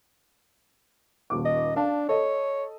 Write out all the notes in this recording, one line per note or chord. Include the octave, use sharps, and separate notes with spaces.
D#1 D#2 D6
D#5
D4 D5 F5 A5
A4 C#5 D#5